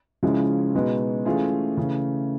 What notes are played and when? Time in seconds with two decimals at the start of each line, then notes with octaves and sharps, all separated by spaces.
0.23 C#3 F3 G#3 C#4 E4
0.74 B2 G#3 B3 D#4 F#4
1.25 E3 A3 C#4 F4 G#4
1.77 C#3 E3 A3